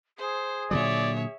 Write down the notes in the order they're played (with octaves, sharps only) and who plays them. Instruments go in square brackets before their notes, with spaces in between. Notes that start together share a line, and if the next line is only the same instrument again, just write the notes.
[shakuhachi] G#4 [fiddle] C5
[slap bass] A#2 D3 F#3 [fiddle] C#5 E5 [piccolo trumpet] D5